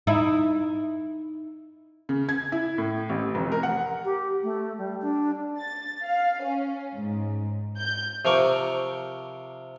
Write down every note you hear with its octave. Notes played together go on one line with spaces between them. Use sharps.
D#4 E4
C#3
G#6
E4
A2
A1
F1
A#4
F#5
G4
A3
G3
D4
A6
F5
C#4
G#2
G6
C3 F3 A#4 C#6 D6